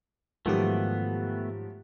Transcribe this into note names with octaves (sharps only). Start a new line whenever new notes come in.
G#2 D#3 F3 F#3 A3 B3 G4